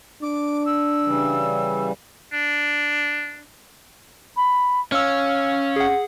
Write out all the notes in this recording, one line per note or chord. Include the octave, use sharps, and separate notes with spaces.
D4 D6
E6
C#3 E3 G3
D4
B5
C#4 F5 E6 F6
G#4 F#5